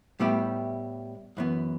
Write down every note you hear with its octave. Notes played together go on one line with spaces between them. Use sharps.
A2 G3 B3 E4 G4
F#2 E3 B3